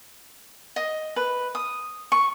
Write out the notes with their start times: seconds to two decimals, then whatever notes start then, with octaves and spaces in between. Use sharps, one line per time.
0.76 D#5
1.16 B4
1.55 D#6
2.12 C#6